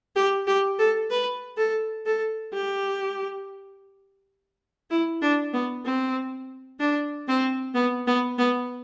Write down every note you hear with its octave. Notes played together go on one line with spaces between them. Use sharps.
G4
G4
A4
B4
A4
A4
G4
E4
D4
B3
C4
D4
C4
B3
B3
B3